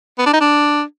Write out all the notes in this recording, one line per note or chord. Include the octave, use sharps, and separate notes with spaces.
B3
D4
D#4
D4